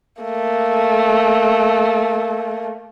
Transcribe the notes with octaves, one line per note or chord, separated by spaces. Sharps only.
A3 A#3